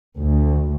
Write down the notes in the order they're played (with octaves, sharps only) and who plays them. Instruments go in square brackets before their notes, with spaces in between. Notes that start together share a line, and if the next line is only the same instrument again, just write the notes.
[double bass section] D2